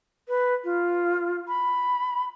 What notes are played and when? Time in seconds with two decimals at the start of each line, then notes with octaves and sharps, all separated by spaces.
0.28 B4
0.64 F4
1.48 B5